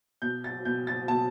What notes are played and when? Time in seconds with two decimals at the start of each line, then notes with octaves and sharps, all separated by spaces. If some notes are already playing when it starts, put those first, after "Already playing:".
0.22 B2 G6
0.44 A6
0.65 B2 G6
0.87 A6
1.08 B2 A5